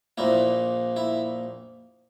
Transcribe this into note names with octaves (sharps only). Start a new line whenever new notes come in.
A#1 A#2 A#3 E4
E4